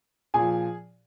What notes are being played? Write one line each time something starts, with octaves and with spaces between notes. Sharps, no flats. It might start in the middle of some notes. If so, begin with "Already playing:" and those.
A#2 F3 G#4 G#5